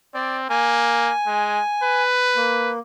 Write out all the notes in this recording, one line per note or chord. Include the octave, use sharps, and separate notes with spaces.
C4 D5
A#3 G#5
G#3
B4
A#3